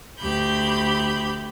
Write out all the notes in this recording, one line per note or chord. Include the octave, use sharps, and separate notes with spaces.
D2 G4 B5 G6